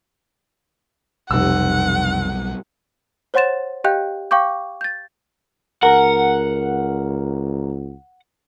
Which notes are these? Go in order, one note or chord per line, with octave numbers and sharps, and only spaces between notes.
F1 B1 G3 F#5 E6
C5 C#5 F#5 C6 A6 E7
G4 D#5 F5 G5 F#6 G6
F5 G5 C#6 D6 G6
G6 A6
C#2 A#4 F#5